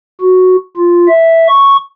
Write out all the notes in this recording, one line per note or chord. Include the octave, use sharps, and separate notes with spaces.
F#4
F4
E5
C#6